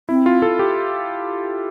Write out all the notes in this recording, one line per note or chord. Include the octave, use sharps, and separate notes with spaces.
C4 E4
F4
A4
G4